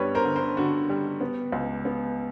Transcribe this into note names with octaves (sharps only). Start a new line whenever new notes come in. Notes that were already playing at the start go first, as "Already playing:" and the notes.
Already playing: G2 G3 B3 B4 C#5
A#4 C5
D3
A#4 C5
D3 F#4
G3
B3
C#2
B3